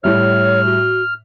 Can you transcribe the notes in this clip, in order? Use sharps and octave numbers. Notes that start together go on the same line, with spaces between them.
A2 G3 C#5 E5 F6
F#4